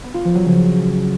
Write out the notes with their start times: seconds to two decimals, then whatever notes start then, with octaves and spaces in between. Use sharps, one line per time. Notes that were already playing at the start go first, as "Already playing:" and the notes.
0.04 B3
0.14 F4
0.25 F3
0.35 F#3
0.45 C#3